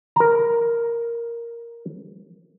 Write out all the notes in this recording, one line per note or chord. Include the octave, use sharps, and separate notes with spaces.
A#4 A#5